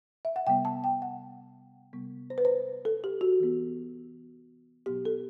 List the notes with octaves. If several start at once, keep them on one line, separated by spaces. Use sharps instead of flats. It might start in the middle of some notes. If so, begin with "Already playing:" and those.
E5
F#5
C3 G3 B3 G5
A5
G5
F#5
C3 G3 B3
C5
B4
C5
A4
G4
F#4
E3 B3
B2 F#3 B3 G4
A4